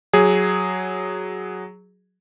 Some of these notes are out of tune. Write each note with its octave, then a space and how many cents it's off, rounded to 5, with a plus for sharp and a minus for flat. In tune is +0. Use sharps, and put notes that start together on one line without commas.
F#3 +0 G#4 +0